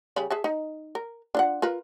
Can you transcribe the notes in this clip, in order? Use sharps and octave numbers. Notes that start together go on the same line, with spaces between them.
C#3 G3 B5
G#4 E5 A5
D#4
A#4
D4 F4 F#5
F4 A#4 B4